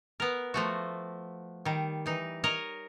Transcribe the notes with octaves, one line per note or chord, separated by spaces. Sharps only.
B3 A#4
F3 A3 F#4
D#3 G3
E3 D#4
A#4 C#5 D#5 A#5